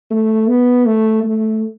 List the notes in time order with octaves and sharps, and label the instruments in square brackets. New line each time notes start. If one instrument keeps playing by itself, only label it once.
[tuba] A3
B3
A3
A3